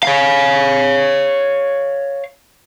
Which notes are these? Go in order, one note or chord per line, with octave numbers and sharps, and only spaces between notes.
C#5 F5